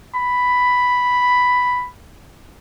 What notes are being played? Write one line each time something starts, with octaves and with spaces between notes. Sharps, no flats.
B5